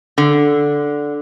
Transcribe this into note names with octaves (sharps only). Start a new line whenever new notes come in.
D3